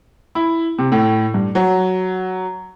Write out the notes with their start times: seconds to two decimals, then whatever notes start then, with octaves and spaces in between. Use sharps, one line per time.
0.35 E4
0.78 C3
0.92 A2
1.34 G2
1.55 F#3